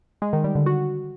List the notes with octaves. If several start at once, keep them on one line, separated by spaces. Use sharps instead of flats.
G#3
D#3
G3
D3
F#4